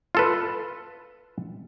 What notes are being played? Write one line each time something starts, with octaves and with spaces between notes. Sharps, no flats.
F4 A4 B4